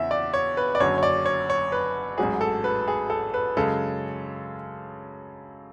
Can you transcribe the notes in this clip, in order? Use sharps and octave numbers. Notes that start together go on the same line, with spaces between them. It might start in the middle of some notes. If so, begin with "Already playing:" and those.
Already playing: E2 C#3 E3 E5
D5
C#5
B4
D5
F#1 F#2 D3 C#5
C#5
D5
C#5
C#5
B4
A1 G#2 F#3 G#4
A4
B4
G#4
A4
B4
F#2 C#3 G#3 A4